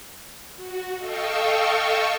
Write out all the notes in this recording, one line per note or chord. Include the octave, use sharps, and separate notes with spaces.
F#4
A4 D#5 F5 G5 C#6 E6